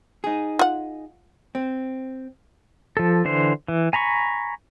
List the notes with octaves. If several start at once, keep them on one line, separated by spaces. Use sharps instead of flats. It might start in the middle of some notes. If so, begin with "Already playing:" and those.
D#4 G#4
F4 F#5
C4
F3 A4
D3 E3 C5
E3
G#5 A#5 B5 C#6